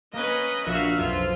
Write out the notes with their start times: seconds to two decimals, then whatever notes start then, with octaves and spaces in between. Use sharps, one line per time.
0.13 A#3 C#4 B4 D#5
0.67 A#1 F#4 E5 F5
0.98 B1 F2 F4